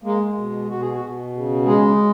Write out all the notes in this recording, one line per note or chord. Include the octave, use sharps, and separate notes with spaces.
G#3 A#3
B2
B2 F#4
G#4
F#4
B2
C#3
G#3 G#4